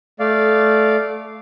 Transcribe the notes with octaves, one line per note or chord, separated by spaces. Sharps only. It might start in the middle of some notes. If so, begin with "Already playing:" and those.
A3 D5 F5